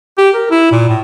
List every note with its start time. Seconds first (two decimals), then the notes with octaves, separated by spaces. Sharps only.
0.18 G4
0.35 A#4
0.51 E4
0.72 A#2
0.89 A2